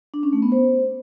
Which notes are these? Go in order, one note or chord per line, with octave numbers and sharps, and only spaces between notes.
D4
C#4
A3
B3
C5